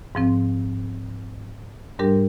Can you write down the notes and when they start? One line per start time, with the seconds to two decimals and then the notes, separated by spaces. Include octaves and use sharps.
0.15 G#2 F3 C4
1.99 G#2 G3 D4 G4 A#4